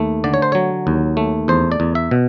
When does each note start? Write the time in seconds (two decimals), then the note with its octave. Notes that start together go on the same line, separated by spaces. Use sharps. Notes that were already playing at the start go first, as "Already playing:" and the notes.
Already playing: D#2 A3
0.24 D3 D5
0.34 C#5
0.42 C5
0.52 F#3 C#5
0.87 D#2
1.17 A3
1.48 E2 C5
1.72 D5
1.80 E2
1.95 E5
2.11 B2